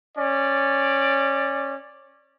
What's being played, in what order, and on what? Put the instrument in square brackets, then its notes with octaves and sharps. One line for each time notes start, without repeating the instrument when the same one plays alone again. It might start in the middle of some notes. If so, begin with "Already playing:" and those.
[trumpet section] C#4 D5